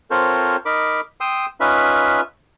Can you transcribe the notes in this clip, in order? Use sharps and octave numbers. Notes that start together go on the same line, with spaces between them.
C4 F4 A4 A#4 C5 C#5
D#4 A#4 B5 D6
G5 C6 D#6 E6
C#4 D#4 F4 B4 E5 B5